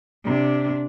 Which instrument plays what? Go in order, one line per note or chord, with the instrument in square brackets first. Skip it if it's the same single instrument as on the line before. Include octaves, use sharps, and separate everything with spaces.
[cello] C3 D4